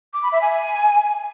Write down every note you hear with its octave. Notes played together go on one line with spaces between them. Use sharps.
D6
B5
E5
G#5